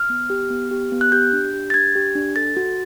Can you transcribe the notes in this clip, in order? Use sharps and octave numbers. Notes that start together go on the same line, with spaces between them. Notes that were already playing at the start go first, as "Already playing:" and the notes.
Already playing: F6
B3
G4
B3
G4
B3
F#6
G4 G6
D4
G4
A6
D4 G#6
G4
D4
A4 A6
F#4